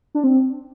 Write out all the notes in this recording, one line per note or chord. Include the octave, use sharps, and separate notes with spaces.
D4
C4